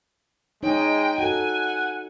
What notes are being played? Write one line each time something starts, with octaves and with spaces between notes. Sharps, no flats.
G#3 D#4 C#5 D#5 G5
F#4 A4 F#5 G#5